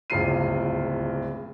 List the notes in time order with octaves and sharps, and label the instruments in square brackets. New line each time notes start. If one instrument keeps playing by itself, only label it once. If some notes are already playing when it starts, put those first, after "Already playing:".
[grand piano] D1 G1 C#2 F4 C7 D#7